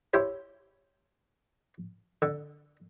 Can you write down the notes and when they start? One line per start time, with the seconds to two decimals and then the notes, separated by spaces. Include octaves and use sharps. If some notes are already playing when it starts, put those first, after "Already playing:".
0.14 E4 G4 C5 C#5
2.22 D3